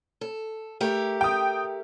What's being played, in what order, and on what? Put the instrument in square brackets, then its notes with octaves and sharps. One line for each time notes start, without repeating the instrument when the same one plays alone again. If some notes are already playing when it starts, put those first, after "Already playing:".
[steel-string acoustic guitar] A4
A3 G4 A#4
[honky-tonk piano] G5 D#6